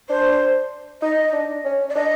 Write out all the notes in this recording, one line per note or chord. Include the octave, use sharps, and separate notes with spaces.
D4 C5
D#4 D#5
D4
C#4
D5
D4 D#5